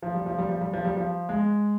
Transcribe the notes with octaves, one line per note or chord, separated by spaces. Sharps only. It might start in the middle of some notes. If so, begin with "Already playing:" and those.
F3
G3
F3
G3
F3
G3
F3
G3
F3
G#3